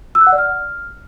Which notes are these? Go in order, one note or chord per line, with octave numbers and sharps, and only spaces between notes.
E6
F#6
F#5
D5
F6